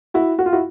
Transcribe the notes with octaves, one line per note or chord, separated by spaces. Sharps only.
E4 F#4
F#4
F4
E4 F#4